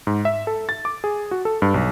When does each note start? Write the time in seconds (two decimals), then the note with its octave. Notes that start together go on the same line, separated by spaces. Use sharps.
0.07 G#2
0.25 E5
0.47 A4
0.69 A6
0.85 D6
1.04 G#4
1.31 F#4
1.45 A4
1.62 G2
1.74 B1